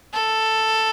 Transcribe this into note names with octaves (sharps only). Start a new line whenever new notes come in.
A4